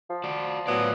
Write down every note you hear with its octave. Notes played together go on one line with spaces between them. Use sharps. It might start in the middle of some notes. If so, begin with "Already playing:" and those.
F3
F#4 D5
A2 E3 F#3 B3 D5